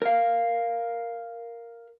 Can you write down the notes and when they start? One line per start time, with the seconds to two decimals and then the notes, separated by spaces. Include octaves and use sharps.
0.02 A#4 F5